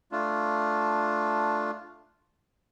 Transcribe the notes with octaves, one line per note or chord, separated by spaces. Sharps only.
A3 D4 F4